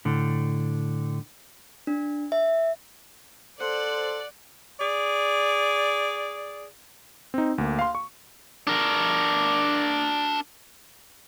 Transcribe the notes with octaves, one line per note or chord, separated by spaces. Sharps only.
A2 D3
D4
E5
A4 C5 D5 F#5
G#4 D5
C4 D#4
D2 A#3
F5 C6
C#6
D4 A#4